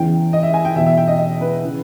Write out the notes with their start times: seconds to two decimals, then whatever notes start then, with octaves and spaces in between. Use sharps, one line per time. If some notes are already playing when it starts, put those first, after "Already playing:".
Already playing: E2 C#3 E3 G5
0.33 D#5
0.43 E5
0.54 G#5
0.65 G5
0.76 E2 B2 E5
0.86 E5
0.97 G5
1.08 D#5
1.19 D#5
1.41 B4
1.63 C#3 E3